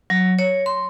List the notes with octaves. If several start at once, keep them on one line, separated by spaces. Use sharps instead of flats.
F#3
C#5
C6